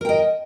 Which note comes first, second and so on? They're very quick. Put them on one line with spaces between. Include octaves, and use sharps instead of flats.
A#4 G5 D#5